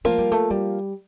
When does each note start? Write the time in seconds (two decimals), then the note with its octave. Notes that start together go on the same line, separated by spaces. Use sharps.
0.04 F3 A3 A#3 F4 A#4
0.18 G3
0.32 A3
0.50 G3